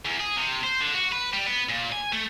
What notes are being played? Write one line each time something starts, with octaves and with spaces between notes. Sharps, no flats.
E2
G#4
C3
C5
D3
F#4
B4
G3
B3
A#2
G#5
A3